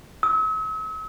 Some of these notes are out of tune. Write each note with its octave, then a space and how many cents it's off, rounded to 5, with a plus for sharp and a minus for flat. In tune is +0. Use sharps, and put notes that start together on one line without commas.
E6 -45